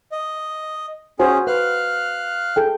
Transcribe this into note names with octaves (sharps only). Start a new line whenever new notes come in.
D#5
C#4 F#4 G#4 C5 G#5
B4 F5 F6 F#6
G#4 A4 G5